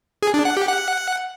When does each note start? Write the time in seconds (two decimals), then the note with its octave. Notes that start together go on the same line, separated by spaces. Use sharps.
0.22 G#4
0.34 D4
0.45 F#5
0.57 G4
0.68 F#5